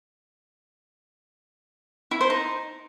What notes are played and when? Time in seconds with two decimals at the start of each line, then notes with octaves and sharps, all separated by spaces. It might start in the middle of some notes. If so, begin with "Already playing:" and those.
2.11 E4
2.21 C5
2.30 D#4